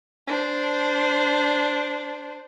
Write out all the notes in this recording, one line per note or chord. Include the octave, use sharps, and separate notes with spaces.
D4 C5